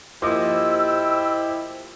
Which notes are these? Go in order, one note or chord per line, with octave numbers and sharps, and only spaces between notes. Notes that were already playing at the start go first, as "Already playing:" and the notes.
F3 A#3 E4 G4 C5 D#5 D6 E6